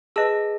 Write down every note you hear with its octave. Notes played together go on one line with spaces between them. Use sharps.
G#4 B4 D#5 A5 E6